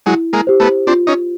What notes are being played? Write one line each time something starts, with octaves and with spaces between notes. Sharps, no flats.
F#3 G#3 E4
G#3 A#3
G4 C5
A3 B3
C4 D4 F4
C#4 D#4